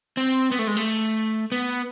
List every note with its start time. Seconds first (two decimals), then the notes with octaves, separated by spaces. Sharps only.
0.17 C4
0.51 B3
0.59 A3
0.67 G#3
0.77 A3
1.52 B3